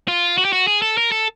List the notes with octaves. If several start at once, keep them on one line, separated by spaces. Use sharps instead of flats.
F4
F#4
G4
F#4
G#4
A4
A#4
A4